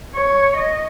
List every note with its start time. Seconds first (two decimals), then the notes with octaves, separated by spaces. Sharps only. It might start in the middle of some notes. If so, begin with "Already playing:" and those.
0.14 C#5
0.57 D#5